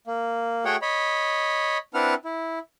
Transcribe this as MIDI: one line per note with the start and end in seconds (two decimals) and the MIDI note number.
0.07 0.64 58
0.65 0.76 57
0.65 0.76 66
0.65 0.76 68
0.65 0.76 73
0.65 0.76 78
0.65 0.76 79
0.82 1.78 73
0.82 1.78 75
0.82 1.78 83
1.94 2.14 60
1.94 2.14 62
1.94 2.14 64
1.94 2.14 71
1.94 2.14 78
1.94 2.14 89
2.25 2.59 64